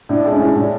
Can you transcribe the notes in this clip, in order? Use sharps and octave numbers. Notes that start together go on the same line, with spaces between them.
A2 D4
G#3
C#4
A2
A2 D4